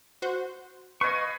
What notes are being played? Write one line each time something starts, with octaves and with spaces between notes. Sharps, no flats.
F#4 C5
B4 D#5 F5 G#5 C#6